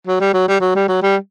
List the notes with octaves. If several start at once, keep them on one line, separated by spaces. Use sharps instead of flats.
F#3
G3
F#3
G3
F#3
G3
F#3
G3